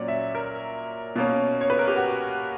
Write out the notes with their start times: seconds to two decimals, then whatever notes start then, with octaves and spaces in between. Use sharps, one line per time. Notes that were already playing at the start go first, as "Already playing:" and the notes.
Already playing: A#2 F#3 C#4 D5
0.08 E5
0.35 A#4
1.16 B2 A#3 C#4
1.61 C#5
1.70 B4
1.79 A#4
1.87 G4
1.96 F#4